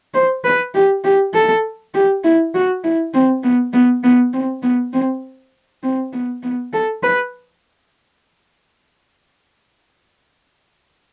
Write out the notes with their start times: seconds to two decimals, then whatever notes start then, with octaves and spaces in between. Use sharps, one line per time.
0.14 C5
0.44 B4
0.75 G4
1.04 G4
1.34 A4
1.94 G4
2.24 E4
2.54 F#4
2.84 E4
3.14 C4
3.43 B3
3.73 B3
4.03 B3
4.34 C4
4.63 B3
4.93 C4
5.83 C4
6.13 B3
6.43 B3
6.73 A4
7.03 B4